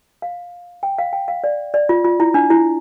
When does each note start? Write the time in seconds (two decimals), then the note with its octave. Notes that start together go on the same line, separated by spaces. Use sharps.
0.22 F5
0.83 G5
0.98 F5
1.13 G5
1.28 F5
1.44 D5
1.74 D5
1.89 F4
2.04 F4
2.20 E4
2.34 D4
2.50 E4